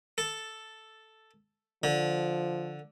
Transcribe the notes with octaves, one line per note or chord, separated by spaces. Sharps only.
A4
D3 F3